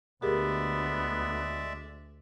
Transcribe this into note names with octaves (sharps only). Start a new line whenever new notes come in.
D2 G#3 B3 G4 G#4 A#4 D5 E5